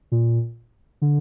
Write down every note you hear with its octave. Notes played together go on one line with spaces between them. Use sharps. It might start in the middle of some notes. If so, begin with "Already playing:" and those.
A#2
D3